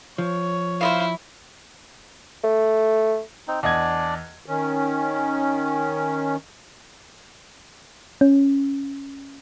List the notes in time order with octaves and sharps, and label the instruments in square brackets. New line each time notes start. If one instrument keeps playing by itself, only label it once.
[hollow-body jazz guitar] F3 [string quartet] C#5
[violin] E4 [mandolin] C5 D#5 F5
[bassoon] A3
[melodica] C4 D#4
[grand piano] E2 D#5 G#6 [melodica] D4 D5
[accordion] D#3 C#4
[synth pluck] C#4